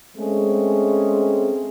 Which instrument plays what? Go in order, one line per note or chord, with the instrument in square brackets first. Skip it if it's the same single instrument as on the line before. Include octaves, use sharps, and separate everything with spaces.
[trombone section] G#3 A3 C4 C#4 G#4